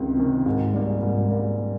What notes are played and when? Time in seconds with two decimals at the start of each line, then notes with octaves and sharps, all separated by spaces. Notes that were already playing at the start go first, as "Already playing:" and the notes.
Already playing: C#2 C3 D#3
0.17 C3 D#3
0.46 G#2
0.74 G3 A#3
1.03 G#2
1.31 G3 A#3